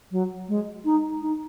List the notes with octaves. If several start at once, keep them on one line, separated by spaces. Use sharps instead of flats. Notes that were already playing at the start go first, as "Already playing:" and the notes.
F#3
G#3
D#4
D#4